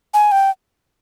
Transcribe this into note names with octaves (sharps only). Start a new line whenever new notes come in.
G#5
G5